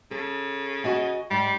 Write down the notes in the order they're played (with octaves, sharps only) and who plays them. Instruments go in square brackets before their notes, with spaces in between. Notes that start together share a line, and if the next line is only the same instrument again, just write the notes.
[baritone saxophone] C#3 [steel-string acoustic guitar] A4
[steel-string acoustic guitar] F#4 D#5 G#5
[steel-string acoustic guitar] G#2 [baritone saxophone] G3